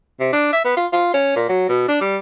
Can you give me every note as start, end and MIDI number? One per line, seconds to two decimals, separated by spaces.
0.20 0.31 48
0.33 0.50 62
0.53 0.63 76
0.65 0.75 59
0.77 0.86 65
0.93 1.14 65
1.14 1.35 61
1.36 1.45 46
1.49 1.65 54
1.69 1.85 47
1.88 2.01 62
2.01 2.17 55